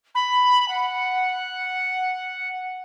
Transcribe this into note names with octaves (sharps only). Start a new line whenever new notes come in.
B5
F#5